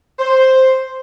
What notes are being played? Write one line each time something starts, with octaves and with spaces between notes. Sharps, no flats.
C5